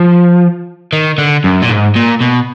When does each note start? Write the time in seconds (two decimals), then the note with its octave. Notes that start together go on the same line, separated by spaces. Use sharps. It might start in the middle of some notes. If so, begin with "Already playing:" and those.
Already playing: F3
0.93 D#3
1.18 D3
1.44 F#2
1.62 A#2
1.70 G#2
1.96 A#2
2.21 B2